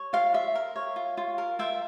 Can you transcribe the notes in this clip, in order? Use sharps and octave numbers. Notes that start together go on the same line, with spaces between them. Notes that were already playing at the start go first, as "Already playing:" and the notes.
Already playing: C#5
F4 F5
F4 E5
A#4
C#5
F4
F4
A#4
F4 E5 G5